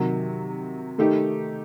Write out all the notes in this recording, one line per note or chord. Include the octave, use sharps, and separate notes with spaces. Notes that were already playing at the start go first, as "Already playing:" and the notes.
Already playing: C3 D#3 F#3
D#3 A3 D#4 G4